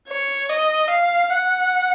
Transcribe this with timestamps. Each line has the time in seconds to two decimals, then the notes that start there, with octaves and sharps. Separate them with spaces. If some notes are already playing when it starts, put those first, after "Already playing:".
0.08 C#5
0.49 D#5
0.90 F5
1.30 F#5